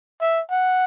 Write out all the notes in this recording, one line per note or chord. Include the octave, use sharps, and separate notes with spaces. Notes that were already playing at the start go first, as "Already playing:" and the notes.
E5
F#5